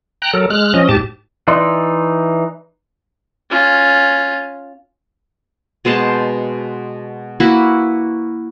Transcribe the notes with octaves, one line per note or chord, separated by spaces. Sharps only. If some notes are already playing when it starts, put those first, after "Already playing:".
G5 A#5 F#6
F#3 A4 A#4
G#3 F6 F#6
F3 C#4 D#5
G#2 G4 A5
E3 D#4 D5 C6
C#4 F4
B2 G#3 C5 A5
A#3 E4 F#4 B4